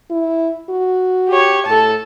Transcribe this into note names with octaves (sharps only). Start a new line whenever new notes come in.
E4
F#4
G4 C#5
A2 A4 A5